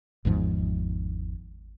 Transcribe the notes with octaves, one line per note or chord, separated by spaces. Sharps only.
G#1 E2 G#2 F3